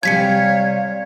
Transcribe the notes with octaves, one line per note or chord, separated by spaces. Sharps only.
C3 G3 C#5 F5 G#5 G#6 B6 C#7